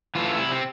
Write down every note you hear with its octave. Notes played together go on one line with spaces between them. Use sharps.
E3 A3 F4
C3 E4
C4